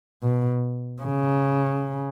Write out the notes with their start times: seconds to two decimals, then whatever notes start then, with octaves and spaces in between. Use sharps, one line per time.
0.23 B2
1.02 C#3